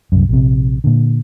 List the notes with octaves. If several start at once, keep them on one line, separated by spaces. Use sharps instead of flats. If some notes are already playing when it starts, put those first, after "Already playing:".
C2 F#2
A#1 C3
A#2 D3